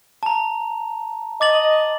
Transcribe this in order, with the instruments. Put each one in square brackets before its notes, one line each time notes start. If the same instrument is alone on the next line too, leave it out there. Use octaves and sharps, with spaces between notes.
[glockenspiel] A5 A#5
[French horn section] D#5 [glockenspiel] D6 A6 F#7